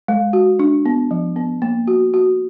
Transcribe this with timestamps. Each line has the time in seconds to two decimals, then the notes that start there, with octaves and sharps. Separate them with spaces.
0.08 G#3
0.33 F#4
0.59 D4
0.86 B3
1.11 F3
1.36 B3
1.62 A#3
1.87 F#4
2.14 F#4